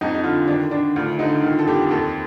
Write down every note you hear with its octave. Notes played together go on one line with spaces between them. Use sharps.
F2 D#4
D#4
D3 F4
D#3 D4
D#3 D4
D2 F4
D3 D#4
D#3 F4
A4
F2 G4
D#2 A4